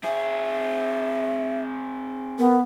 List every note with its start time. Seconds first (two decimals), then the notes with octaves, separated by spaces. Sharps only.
0.04 C4 G#4 E5
2.39 B3 A#4